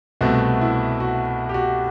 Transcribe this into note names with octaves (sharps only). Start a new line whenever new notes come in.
C2 B2 A3 C4 F#4
E4
F#4
G4
F#4